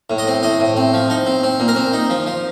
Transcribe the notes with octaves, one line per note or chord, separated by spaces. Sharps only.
A2
D#5
C4
A2 D#5
A2
C4
F3
D#4
C4
C4
A#2
A#4
C4
D#4
F3
F3